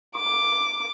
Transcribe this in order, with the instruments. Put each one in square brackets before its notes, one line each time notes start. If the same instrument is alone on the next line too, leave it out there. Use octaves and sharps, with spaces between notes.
[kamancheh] D6